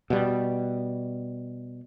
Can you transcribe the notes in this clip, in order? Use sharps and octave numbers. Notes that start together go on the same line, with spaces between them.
B2 G3